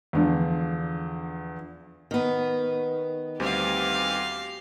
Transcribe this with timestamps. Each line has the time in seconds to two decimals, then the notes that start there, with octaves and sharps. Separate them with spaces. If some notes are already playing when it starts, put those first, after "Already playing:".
0.13 E2 D3 F3
2.11 D#3 B3
3.40 D2 G3 C4 G4 F5